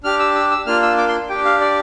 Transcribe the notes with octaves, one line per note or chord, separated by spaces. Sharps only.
D4 G4 F6
E6
E6
E6
A#3 D4 F4 F6
E6
D6
C6
D4 G4 G5
F5
D5